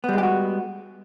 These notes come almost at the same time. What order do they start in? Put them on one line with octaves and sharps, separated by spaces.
B3 G3 G#3 G4 F#4